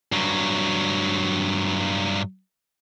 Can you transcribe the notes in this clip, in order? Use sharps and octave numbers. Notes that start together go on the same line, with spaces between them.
G2 F#3